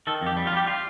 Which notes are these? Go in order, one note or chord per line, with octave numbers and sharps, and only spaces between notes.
D#3 A4
F2 G4
G3
F4
G3 G4
F4